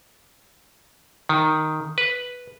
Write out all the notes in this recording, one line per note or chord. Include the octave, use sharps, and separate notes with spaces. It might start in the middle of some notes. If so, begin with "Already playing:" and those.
D#3
B4